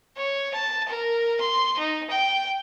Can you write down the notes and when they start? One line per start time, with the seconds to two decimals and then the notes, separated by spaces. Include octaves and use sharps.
0.17 C#5
0.54 A5
0.88 A#4
1.40 C6
1.78 D#4
2.10 G5